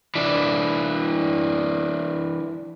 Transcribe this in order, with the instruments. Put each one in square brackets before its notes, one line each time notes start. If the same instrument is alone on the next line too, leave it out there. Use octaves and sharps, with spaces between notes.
[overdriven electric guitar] E3 D4